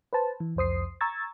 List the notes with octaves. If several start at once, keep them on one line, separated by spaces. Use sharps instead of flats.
B4 C5 A5
E3
C2 F2 C5 D#6 C7
A#5 C#6 E6 G#6 A6